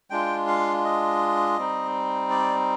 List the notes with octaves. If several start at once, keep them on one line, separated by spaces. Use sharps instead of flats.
G#3 D4 F4 G5
F5
D#5
G3 C4 D#4
D5